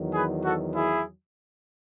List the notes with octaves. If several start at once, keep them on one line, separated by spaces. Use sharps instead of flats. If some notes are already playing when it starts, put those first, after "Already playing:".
Already playing: E2 D#3 F#3
G#4 B4
F#4 A4
E4 G#4